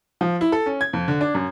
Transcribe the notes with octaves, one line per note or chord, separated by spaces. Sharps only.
F3
E4
A4
C#4
G#6
F2
D3
D4
F#2